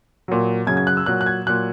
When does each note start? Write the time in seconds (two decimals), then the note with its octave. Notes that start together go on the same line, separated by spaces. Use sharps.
0.28 A#2 F#3
0.67 F#2 C#3 F#3 G#6
0.77 G#6
0.87 F#6
0.97 E6
1.06 A#2 F#3 F#6
1.21 F#6
1.26 G#6
1.46 A#2 F#3 F#6